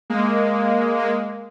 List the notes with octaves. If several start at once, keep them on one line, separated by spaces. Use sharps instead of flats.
G#3 A#3
G#3 A#3